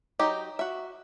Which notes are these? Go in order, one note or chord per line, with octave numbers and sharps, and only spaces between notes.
F#3 D#4 G4
F#4 E5